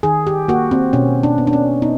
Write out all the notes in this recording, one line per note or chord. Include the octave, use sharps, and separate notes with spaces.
D#3 G#4
G4
A#3 F#4
C4
B2 C#4
D4
B3
D4
C#4
B3 D#4